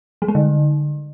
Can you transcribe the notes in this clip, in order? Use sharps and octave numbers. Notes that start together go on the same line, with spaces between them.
G3
G#3
D3